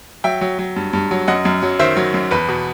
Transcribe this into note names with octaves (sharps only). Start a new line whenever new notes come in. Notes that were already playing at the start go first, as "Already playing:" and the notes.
F#3 E5 G5
F#3
F#3
G2
G2
F#3
F#2 D#5 F#5
F#2
F#3
D#3 C5 E5
F#3
F#2
E2 B4
B2